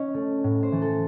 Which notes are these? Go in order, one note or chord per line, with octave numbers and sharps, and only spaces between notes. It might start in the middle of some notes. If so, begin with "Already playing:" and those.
Already playing: C#4 D#4
A3
A2
C5
E3 A3
A4